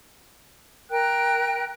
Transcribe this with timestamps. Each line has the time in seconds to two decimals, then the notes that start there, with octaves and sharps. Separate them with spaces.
0.90 A#4 G5 F#6